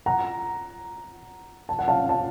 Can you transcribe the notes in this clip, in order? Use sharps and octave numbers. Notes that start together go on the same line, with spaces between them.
F#5 A#5
A5
F#5
F5 A5
A5